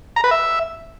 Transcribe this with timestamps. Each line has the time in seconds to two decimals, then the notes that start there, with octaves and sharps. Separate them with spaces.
0.16 A#5
0.24 B4
0.31 E5